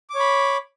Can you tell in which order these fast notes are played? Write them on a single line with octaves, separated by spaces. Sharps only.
D6 C#5 B5